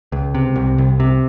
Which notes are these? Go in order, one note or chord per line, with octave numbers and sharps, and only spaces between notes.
C#2
C3
C2
C2
C3